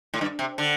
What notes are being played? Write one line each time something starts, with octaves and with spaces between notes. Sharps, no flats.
A2
G2
C3
D3